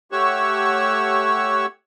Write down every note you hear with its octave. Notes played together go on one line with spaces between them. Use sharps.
A3 G4 C#5 F#5 C#6 E6